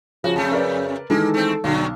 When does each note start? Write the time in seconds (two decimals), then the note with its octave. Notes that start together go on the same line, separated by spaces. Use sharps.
0.24 C#3 F3 F#4
0.36 F2 A3 A5
0.52 A#4 B4 D5
1.10 D#3 E3 G#3 A#3 A4
1.34 A3 C4
1.64 B1 G2 D3 F#3